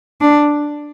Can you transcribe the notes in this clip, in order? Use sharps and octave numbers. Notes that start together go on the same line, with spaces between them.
D4